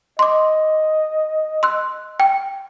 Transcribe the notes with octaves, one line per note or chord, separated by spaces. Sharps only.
D#5 C6 D6
C6 E6 F#6
G5